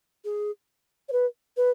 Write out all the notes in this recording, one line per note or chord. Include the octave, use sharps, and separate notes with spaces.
G#4
C#5
B4
B4